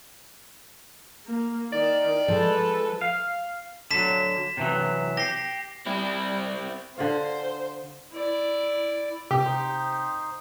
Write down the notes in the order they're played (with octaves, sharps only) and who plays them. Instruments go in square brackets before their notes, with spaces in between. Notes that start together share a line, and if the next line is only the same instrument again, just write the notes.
[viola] A#3
[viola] D#3 [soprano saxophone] D5
[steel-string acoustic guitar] F3 G#3 [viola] A4 B4
[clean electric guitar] F5
[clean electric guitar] D3 F#3 [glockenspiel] B6 E7
[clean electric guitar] C3 E3 F#3
[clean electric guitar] G4 [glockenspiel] A#6 C7
[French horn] G3 [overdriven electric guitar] C4 E4
[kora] D3 F4 F5 [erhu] C5
[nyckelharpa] E4 D5
[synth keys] C3 [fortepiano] G4
[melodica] D#4 C5